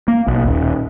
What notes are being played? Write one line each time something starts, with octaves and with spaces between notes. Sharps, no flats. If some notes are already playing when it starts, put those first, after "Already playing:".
A#3
B1
D#1